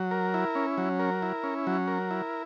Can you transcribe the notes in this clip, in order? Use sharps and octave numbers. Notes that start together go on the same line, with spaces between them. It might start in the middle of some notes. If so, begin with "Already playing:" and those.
Already playing: F#3
A#4
E4
C#4
F#3
A#4
E4
C#4
F#3
A#4
E4